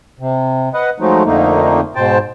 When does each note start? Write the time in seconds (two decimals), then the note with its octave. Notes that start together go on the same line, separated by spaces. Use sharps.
0.19 C3
0.74 B4 D#5 F#5
1.00 F3 F#3 G#3 A3 D#4
1.25 F2 D3 A3 A#3 D#4
1.96 G#2 B2 C5 G5 A5